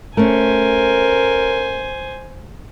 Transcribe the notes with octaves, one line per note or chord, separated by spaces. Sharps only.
A3 C#4 A#4 C5 G#5